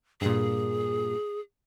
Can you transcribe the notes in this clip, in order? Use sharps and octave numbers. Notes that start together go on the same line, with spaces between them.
G2 A#2 G#4